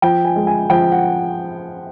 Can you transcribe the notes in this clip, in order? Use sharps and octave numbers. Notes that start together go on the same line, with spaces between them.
F3 G5
G#5
G#3
G#5
F3 G5
F#5